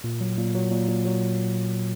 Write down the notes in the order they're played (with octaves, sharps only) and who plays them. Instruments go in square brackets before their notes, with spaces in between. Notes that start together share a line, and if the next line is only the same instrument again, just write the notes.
[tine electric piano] A#2
F#3
A#2
F#3
A#2
A#2
F#3